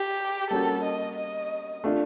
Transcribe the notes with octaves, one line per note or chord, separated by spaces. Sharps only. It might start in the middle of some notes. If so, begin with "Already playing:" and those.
Already playing: G4
G3 A#3 C#4 F#4 A4 A#4
D#5
D#5
A3 D4 F4